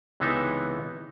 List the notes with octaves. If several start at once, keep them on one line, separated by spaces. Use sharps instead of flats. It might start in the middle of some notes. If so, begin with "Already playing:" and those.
C#2 C3 E3 B3 D#4 E5